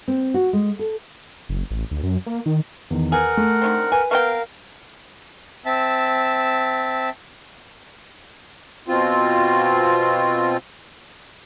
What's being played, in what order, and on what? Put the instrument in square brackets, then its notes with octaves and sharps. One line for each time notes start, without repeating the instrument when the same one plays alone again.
[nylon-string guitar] C4
F#4
G#3
A4
[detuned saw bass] F#1
A1
D2
F#2
A#3
D#3
[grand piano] E2 D#3
[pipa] G#4 [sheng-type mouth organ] A#4 F#5 [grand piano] B4
[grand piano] A3
[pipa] D3 D#3 C4
[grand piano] B4 [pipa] G#5
[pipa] A3 B3 G5 [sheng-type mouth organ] A#4 F5
[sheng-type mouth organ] C4 E5 A5
[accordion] B2 C4 F4